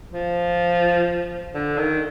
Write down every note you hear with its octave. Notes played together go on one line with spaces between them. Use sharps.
F3
D3
D#3